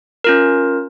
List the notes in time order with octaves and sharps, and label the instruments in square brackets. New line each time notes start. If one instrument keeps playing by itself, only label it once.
[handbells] C#4 F4 A#4